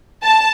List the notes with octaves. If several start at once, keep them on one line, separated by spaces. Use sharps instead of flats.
A5